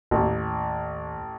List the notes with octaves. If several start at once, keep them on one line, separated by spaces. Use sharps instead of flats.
A1 D#2